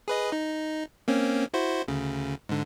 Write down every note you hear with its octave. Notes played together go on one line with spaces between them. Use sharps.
G#4 B4 D#5
D#4
A#3 C4 C#4
E4 F#4 C5
D2 C#3
G#2 D3